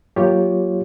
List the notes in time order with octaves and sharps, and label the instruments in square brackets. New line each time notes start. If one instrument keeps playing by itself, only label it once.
[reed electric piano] F#3 A#3 F4 G4 C#5